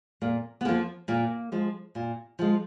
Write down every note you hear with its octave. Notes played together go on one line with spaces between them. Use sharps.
A#2 A#3
B3
F3 G#3 A#3
A#2 A#3
F3 G#3
A#2
F3 G#3